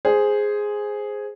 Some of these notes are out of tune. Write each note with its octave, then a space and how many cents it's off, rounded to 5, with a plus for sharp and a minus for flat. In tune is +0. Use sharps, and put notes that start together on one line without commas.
G#4 +0 C5 +0